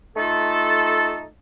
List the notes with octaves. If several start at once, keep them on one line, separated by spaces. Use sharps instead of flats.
A3 D#4 F4 A4